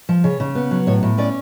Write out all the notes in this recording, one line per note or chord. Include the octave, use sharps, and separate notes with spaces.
F3
C#3 C#5
C#3
B3
F#3
A2 C#5
A2
C#4 D5